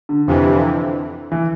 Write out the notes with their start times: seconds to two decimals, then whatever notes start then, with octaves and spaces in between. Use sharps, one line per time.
0.09 D3
0.27 F2 C3 E3
1.32 E3